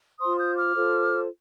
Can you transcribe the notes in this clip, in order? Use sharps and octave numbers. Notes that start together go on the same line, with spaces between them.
F4 C5 C6 D#6
D#6 G6
D6 F6
F4 A4 C5